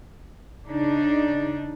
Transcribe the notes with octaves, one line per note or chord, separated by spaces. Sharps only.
C#3 D4 D#4